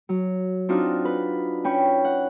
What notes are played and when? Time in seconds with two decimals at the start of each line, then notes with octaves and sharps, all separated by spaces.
0.09 F#3
0.69 C4 D4 D#4 F4 F#4
1.05 B4
1.64 C#4 G5 B5 C#6
2.05 F#5